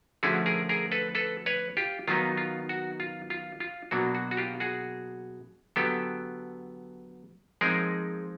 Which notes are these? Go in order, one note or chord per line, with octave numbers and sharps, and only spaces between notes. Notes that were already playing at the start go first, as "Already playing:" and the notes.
D3 F3 A3 C#4 E4 F#4 G#4
G#4 A#4
G#4 A#4
A4 B4
A4 B4
B4 C#5
F4 G4
D#3 F#3 B3 D#4 F4
F4
F#4
F4
F4
F4
B2 F#3 A#3 D4 F#4
F#4
F#4
F4 G4
F#4 G#4
D3 F#3 B3 G4 A4
F3 G#3 C4 D#4 G#4 A#4